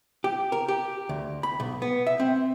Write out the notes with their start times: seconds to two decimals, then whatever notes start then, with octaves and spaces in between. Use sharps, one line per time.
0.24 G4
0.52 A#4
0.68 G4
1.09 D2
1.43 B5
1.60 B1
1.82 B3
2.07 E5
2.20 C4